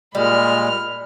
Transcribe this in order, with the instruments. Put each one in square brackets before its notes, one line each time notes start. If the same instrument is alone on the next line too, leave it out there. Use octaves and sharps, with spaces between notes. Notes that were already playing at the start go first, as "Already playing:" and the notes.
[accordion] A#2 G#3 [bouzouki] G3 [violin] B5 F6